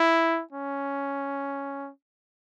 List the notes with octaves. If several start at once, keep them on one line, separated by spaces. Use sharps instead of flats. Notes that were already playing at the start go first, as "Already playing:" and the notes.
Already playing: E4
C#4